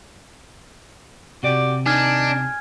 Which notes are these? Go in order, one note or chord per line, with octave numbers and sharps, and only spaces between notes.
C3 F#4 G4 D5
D#3 D4 D#4 G#5 F6 G#6